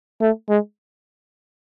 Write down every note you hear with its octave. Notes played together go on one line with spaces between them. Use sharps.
A3
G#3